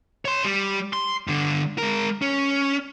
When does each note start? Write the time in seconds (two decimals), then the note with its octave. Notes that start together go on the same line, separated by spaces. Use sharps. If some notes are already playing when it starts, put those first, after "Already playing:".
0.25 C#5 C6
0.45 G3
0.93 C6
1.27 G2 D3
1.78 G#3 A#4
2.22 C#4